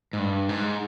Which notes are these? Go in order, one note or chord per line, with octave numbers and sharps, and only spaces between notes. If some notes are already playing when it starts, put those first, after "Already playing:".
G#2
G2
G#2